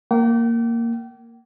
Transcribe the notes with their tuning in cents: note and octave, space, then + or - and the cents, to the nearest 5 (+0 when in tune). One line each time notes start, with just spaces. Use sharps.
A#3 -10 G5 -40